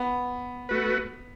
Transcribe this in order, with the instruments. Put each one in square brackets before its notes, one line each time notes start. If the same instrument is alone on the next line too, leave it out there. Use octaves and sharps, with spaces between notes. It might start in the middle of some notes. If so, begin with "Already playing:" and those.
Already playing: [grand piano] B3
[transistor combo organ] A3 F#4 B4